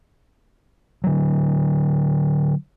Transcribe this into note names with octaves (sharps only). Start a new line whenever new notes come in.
D3 F#3